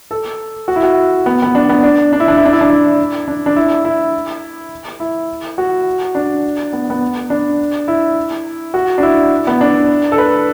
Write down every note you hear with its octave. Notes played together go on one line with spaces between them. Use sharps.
A4
F#4
E4
F#4
B3
B3
D4
B3
D4
D4
E4
D4
E4
D4
E4
D4
E4
D4
D4
E4
E4
E4
F#4
D4
B3
B3
D4
E4
F#4
D4
E4
B3
D4
A4
B4